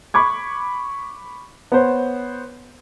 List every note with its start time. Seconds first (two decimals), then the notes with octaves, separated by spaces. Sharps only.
0.14 B5 C#6 D6 G#6
1.72 B3 C5 C#5